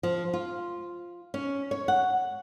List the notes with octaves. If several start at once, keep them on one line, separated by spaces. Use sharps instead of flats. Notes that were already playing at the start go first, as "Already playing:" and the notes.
F3
F4
C#4
C#5
F#5